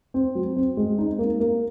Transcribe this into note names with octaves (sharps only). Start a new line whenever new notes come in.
C4
F#3
C4
G#3
D#4
A#3
A#3